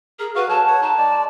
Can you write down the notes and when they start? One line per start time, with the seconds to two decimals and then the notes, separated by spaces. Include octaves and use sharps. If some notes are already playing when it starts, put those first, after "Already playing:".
0.19 G#4 A#4
0.35 F#4 B4 F5
0.49 F#3 A4 G#5 A5
0.68 C#5 F#5
0.81 D#4 A5
0.98 G#3 D5